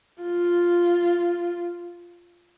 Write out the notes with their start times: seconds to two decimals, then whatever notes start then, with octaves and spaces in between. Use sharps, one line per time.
0.22 F4